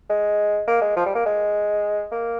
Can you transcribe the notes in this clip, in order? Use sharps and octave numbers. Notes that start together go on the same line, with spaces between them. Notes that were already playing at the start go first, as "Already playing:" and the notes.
G#3
A#3
G#3
F3
G3
A#3
G#3
A#3